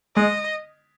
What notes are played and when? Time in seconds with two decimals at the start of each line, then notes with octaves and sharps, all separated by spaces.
0.16 G#3 D#5